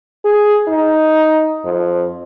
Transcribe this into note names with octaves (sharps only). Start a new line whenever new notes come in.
G#4
D#4
F2